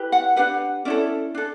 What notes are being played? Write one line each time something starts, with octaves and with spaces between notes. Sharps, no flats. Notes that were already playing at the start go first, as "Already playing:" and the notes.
Already playing: E4 G4 B4
F#5
D4 G4 B4 F#5
C#4 E4 A4 D5
D4 A4